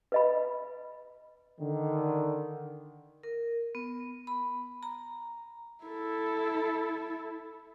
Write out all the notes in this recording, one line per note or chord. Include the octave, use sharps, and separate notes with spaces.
B4 D#5 B5
D3 D#3
A#4
B3
B5
A#5
E4 A4